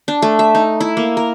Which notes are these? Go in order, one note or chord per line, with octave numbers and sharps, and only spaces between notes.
D4
A3
E5
D#4
E4
A#3
A#4